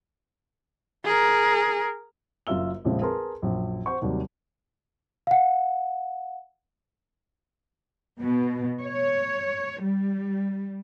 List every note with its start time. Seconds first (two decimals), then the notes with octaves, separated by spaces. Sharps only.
1.05 G#4 A#4
2.47 F#1 F#2 F4 E5 E6 G7
2.85 A#1 F2 A#2 C#3 F3 G#3
3.02 G#4 A#4 B4 A5 C6
3.42 A#1 F#2
3.86 C5 F#5 C#6
4.02 D#2 C3 F#3 G3
5.27 F5 F#5
8.20 B2
8.81 C#5
9.82 G3